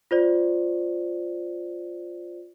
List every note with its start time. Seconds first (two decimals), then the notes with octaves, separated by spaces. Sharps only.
0.11 F4 C5 D5